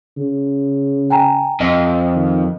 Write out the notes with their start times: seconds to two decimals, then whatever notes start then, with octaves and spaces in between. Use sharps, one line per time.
0.17 C#3
1.10 G5 G#5 A#5
1.60 F2 D#5
2.15 D#3